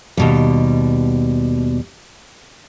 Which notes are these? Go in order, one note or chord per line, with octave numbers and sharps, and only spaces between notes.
D#2 B2 G3